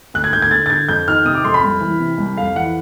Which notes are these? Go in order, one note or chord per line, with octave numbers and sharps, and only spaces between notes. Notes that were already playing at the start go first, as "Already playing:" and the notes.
D2 F#6
G#6
D2 G6
G#6
D3 A6
A6
D3 G#6
F2 G6
D#3 F6
C3 D#6
D6
F2 C6
B5
C2
E3
C3
C2
F2 F5
E3 F#5